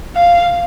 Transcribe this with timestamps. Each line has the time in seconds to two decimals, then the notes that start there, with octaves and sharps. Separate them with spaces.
0.16 F5